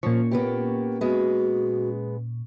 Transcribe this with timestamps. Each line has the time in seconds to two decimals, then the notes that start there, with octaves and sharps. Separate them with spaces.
0.03 A#2 F3 C#4 C#6
0.31 A#3 B3 G4
1.01 G#3 B3 F#4